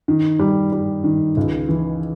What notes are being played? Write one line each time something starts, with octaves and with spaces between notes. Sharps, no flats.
D#3
G3
G3
D#3
C#2
E3